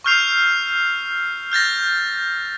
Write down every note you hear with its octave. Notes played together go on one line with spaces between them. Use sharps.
C#6 E6 F6 G6 C7 F7
F6 G6 A6 A#6